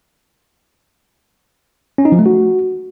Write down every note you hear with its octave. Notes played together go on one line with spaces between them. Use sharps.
C#4
D#4
F3
A3
F#4